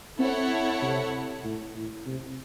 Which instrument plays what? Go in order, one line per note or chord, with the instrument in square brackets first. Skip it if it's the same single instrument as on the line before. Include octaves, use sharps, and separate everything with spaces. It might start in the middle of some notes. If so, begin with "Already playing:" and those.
[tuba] C4 [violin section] E4 A4 C#5 F#5
[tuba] C3
A2
A2
C3